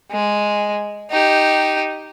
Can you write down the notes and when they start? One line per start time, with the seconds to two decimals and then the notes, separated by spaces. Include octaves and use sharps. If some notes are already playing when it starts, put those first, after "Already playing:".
0.11 G#3
1.11 D#4 G4